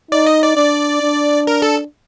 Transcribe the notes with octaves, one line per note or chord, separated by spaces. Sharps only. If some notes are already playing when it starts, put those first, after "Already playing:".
D#4 D5
D#5
D5
D4 D5
D4
A#4
A4